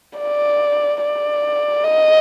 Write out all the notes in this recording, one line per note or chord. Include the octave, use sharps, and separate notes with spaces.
D5
D5
D#5